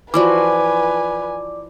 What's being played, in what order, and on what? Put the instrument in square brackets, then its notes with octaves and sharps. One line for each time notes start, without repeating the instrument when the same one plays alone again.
[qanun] E3 F3 F#4 [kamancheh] B4 G#5 [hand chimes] D5 D6